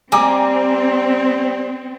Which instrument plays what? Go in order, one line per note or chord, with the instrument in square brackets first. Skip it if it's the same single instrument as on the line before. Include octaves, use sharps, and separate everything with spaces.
[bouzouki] G3 [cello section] C4 [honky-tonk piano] G#5 A#5 D6